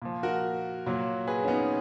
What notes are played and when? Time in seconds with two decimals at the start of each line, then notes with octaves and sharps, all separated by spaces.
0.02 A#2 F3
0.23 F#4 A#4
0.86 A#2 F#3
1.27 G#4 B4
1.44 C#4
1.48 B3 D#4